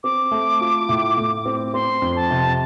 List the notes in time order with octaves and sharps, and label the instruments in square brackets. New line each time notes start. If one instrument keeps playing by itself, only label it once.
[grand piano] C4 [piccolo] D6
[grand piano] A3
F4
A2
A2
C4
[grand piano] C4 [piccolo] C6
[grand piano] F2
[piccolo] A5
[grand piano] C3